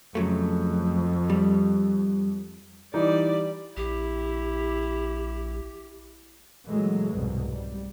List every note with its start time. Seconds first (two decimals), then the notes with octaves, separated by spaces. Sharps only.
0.15 F2 C#3 F#3 A3
1.30 G3
2.94 E3 G3 D#4 D5
3.77 A#1 E4 G4
6.68 A#2 E3 F#3 G#3 A3
7.12 F1 C2 G#2 B2
7.50 G3